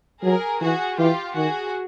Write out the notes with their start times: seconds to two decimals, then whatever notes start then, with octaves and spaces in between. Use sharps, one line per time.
0.23 F#3 G#4 A#4
0.60 E3 F#4 G#4
0.98 E3 F4 G4
1.36 D#3 F#4 G#4